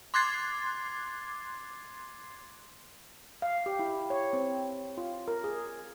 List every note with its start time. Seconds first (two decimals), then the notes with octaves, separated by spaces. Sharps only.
0.14 C6 D6 F#6 G#6 A6 C7
3.42 F5
3.66 G4
3.79 E4
4.10 C#5
4.33 C4
4.98 F4
5.28 A#4
5.44 G#4